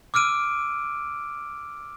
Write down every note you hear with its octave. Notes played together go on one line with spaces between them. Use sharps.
D6 E6 F6 D7 D#7